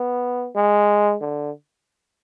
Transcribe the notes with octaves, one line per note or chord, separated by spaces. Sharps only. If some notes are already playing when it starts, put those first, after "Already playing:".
Already playing: B3
G#3
D3